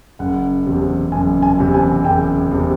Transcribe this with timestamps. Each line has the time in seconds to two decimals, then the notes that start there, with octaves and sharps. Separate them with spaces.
0.19 F#1 F#5
0.66 E2 C3
1.12 F#1 G#5
1.42 G#5
1.59 E2 C3
1.74 G#5
2.04 F#1 G5
2.51 E2 C3